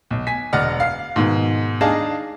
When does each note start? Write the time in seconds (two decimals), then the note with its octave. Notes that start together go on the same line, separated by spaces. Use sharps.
0.11 B1
0.27 G#5 B6
0.53 E1 D5 D#5 F#5 F6
0.80 F5 C7
1.16 G#2 B2 D#3
1.81 D4 D#4 G#4 D#5 F5 A5